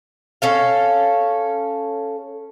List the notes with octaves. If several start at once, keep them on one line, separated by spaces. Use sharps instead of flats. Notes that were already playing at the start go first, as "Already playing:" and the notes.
C#4 A4 F5